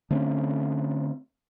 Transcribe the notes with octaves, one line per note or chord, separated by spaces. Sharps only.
D3 A3 C4 C#4